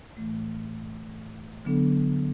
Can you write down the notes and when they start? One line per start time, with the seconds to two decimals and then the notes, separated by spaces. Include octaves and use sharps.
0.17 A2 E3 A3
1.65 D3 F#3 B3 D4 A4